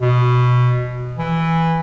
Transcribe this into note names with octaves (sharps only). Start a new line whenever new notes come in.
B2
E3